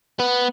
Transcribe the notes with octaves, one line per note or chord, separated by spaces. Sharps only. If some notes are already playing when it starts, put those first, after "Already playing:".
B3